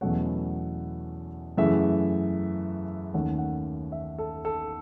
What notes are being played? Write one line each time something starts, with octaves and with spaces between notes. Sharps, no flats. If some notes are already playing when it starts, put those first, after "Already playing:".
E2 B2 F#3 A3 C#4 F#5
F#2 C#3 E3 A3 E5
D#2 D#3 A3 C#4 F#5
F#5
E5
A4
A4